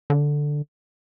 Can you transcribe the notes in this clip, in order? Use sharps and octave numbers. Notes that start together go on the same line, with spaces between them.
D3